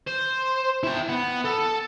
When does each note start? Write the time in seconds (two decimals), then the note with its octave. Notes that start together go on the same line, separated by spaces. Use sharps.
0.07 C5
0.83 E4 G5
1.09 B3
1.45 A4